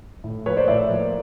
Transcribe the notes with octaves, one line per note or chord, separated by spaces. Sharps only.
A2
F3 A#3 B4 C#5
C5 D5
A2 D5 E5
F3 A#3